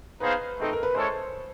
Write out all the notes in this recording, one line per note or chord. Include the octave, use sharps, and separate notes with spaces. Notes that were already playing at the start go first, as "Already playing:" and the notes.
B3 D#4 G#4 B4 C5 F5
A3 C4 D#4 A4
A#4
B4
G#3 C#4 E4 A4 C5 C#5